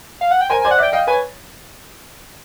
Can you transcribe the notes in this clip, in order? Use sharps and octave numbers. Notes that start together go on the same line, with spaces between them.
F5
F#5
G5
A#4 C5 G#5
G#5
C5 D5
F#5
D5 E5 G5
D#5 F5 G5
B4 C#5 G#5